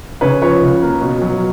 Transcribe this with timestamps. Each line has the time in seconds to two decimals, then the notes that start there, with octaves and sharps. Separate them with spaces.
0.21 C#3 B4 C#5
0.42 F3 B4 C#5
0.61 C#2
0.82 A#3
1.01 B2
1.22 F#3